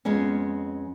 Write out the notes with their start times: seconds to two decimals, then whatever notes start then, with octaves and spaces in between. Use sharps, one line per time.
0.05 F2 G#3 B3 C#4